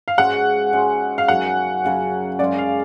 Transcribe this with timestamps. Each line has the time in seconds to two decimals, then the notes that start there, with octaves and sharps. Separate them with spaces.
0.08 F5
0.18 G#2 G#3 C#4 F#4 F#5
0.73 G#2 G#3 C#4 F#4
1.18 F5
1.28 F#2 C#3 F#3 F#5
1.84 F#2 C#3 F#3
2.39 F#2 C#3 G#3 D5
2.58 F5